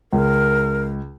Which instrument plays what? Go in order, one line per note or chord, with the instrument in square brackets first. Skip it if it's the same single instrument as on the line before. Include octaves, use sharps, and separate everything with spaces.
[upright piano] C#2 [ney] A#4